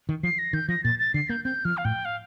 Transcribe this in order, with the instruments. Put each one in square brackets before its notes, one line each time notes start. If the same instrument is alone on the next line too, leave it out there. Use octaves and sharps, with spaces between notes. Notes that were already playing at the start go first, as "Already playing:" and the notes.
[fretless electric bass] D#3
[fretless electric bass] F3 [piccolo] C7
[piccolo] A#6
[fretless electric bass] D#3 [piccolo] G6
[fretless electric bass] F3 [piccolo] A#6
[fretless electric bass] A#2 [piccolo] A6
[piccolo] A6
[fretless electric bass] D3 [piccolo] C7
[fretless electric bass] A#3 [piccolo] G6
[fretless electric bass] C4 [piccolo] G6
[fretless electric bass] F3 [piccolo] F6
[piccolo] F5
[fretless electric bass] A2 [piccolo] G5
[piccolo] F5